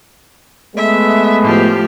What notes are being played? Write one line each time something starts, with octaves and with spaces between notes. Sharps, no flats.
G#3 A3 B3 E5
A2 F3 G4